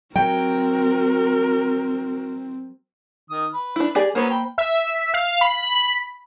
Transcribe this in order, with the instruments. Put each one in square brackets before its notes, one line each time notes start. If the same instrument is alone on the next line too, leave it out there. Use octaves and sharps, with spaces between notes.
[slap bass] F#3 [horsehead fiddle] C4 [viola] F#4 A#4 [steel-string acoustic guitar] G5
[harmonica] D#3 D#6
B4
[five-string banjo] D4 E4
G4 G#4 D5
[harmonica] F#3 B3 C#4 [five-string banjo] A#3 C5
[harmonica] G5 B5
[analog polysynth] E5
F5
B5